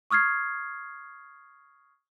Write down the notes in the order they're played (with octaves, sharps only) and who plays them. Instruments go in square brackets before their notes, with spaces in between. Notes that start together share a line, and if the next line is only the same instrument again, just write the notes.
[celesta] C#6 D#6 F6 G#6 C7